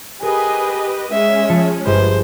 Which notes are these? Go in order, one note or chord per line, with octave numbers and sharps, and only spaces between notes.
G4 G#4 A#4 B4 D#5
G#3 C#4 E5
F3 A5 C#7
G1 G#4 B4 C5